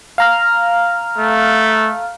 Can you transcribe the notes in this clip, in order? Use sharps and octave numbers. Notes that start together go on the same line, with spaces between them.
F5 A#5 F6
A3